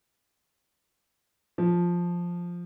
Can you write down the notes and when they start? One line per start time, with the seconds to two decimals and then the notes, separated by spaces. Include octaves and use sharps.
1.58 F3